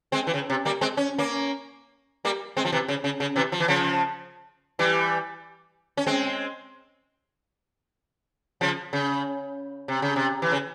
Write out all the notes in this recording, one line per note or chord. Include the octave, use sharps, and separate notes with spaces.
G#3 C4
E3
C#3
C3
G3 A#3
G#3 C4
C#4
A#3 C#4
G3 A#3
G#3 C4
F3
C3 E3
C#3
C#3
C#3
C3 E3
F3
E3
C#3 F3
E3 G3
C#4
G#3 C4
C#3 F3
C#3
C3
C#3
C3
E3
C#3